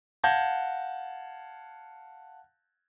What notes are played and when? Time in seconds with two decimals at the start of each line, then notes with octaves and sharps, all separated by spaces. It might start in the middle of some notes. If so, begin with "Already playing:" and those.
0.24 F5 F#5 A5 G6 G#6 A#6